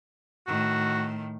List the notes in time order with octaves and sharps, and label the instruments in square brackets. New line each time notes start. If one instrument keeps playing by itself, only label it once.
[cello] A2 D#3 [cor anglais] F#4